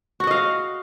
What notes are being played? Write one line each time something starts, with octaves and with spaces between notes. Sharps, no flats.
F#4 D#5 F5 F#5